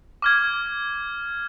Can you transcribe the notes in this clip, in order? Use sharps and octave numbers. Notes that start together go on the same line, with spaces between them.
D6 F6 G#6